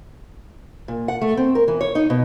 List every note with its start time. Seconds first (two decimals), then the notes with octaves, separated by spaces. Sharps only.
0.88 A#2
1.08 F#5
1.22 A3
1.37 C4
1.55 A#4
1.68 E3
1.81 C#5
1.95 D#4
2.10 B2